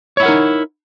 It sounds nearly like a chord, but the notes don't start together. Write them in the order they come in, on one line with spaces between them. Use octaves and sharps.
C#5 E4 F#5 A#4 D#4